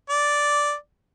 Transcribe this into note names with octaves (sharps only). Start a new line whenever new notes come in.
D5